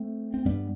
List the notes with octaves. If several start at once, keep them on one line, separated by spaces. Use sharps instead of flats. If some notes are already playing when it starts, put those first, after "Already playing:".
Already playing: A3 C4
C4
G2 G3 B3